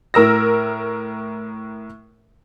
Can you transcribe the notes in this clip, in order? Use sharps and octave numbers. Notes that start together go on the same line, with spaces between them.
A2 A#4 E6 A#6